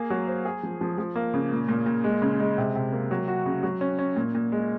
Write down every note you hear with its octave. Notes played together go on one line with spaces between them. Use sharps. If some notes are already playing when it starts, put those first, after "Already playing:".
Already playing: A#3 G#4
F#3
C5
G#4
F3
F3
F3
A#3
C#3
A#2
A#2
A#2
G#3
C#3
G#3
C3
C3
A#3
F#3
F#4
C#3
F#3
C#4
C#4
A#2
A#2
G#3